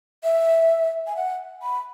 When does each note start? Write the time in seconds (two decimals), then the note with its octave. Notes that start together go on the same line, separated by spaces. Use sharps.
0.23 E5
1.07 G#5
1.16 F#5
1.62 B5